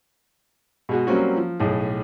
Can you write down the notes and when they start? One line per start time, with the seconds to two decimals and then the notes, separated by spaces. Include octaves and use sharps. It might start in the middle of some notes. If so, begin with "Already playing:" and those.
0.89 B2 G#3 F#4
1.07 F#3 G3 A#3 C4 C#4 F#4
1.37 F3
1.60 B1 A2 G#4